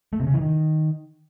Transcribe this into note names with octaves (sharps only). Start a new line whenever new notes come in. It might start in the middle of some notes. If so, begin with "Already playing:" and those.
A3
C3
C#3
E3
D#3